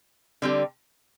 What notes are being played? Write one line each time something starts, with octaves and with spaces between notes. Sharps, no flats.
D3 G3 C4 G4